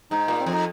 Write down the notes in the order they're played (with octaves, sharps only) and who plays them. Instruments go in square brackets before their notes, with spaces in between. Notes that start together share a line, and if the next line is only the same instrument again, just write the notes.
[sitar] G#2 [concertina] D#4
[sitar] A#2 [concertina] A#3
[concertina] C4
[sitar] F2
[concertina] D#4